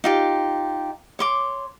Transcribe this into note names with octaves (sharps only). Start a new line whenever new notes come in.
D#4 F4 G4
C#5 C6 D6